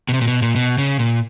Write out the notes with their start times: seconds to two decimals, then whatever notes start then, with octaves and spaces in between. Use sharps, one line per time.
0.09 B2
0.13 C3
0.21 A#2
0.27 B2
0.42 A#2
0.56 B2
0.78 C#3
0.99 A#2